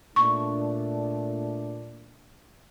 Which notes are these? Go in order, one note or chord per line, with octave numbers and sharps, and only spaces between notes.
A#2 A3 D4 C#6